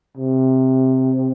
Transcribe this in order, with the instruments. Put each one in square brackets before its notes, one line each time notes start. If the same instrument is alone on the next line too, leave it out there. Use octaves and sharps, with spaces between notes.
[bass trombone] C3